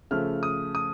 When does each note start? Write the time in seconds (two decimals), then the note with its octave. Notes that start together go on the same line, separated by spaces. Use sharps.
0.11 C#3 F3 A3 F6
0.43 D#6
0.75 D#6